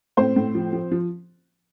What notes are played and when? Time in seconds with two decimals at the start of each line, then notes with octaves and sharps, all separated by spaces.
0.17 A2 C4 C5
0.36 A2
0.55 F3
0.73 F3
0.91 F3